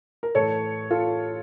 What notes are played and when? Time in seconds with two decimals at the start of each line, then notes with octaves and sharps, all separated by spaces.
0.23 A#4
0.35 A2 E3 A4 C#5
0.91 F4 A4